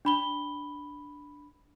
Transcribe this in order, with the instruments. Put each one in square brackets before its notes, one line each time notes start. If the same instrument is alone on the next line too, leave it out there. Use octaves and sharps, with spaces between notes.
[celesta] D4 B5 G7